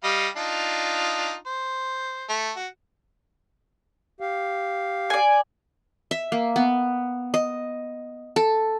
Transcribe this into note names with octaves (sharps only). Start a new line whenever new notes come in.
G3 D#5 F5
D4 D#4 F4
C5
A3
F#4
G4 F5
D5 G#5
E5
A#3
B3
D#5
A4